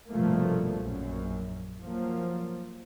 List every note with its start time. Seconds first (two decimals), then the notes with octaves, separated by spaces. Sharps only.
0.11 F1 G2 B2 F3 A3 A#3
0.81 A#1 F#2
1.83 F3 F#3 A#3